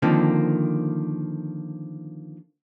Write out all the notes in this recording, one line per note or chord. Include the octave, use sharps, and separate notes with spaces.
D3 D#3 F3 A#3 C4